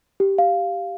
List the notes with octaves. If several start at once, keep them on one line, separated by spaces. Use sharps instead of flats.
G4
F5